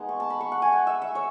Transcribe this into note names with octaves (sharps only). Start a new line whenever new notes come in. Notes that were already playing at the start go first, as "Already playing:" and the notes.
Already playing: G#3 B3 D#4 F#5
C#6
A5
B5
C#6
F#5
G#5
F#5
E5
E5
C#5